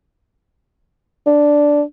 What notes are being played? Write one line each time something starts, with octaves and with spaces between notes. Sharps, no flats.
D4